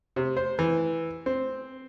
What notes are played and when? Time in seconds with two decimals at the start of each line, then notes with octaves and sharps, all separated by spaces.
0.16 C3
0.37 C5
0.59 E3
1.26 C4